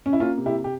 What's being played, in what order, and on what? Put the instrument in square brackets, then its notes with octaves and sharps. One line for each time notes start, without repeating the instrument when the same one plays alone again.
[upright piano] C#4
E4
A#3 C#4 F4
C3
E4 G4
G4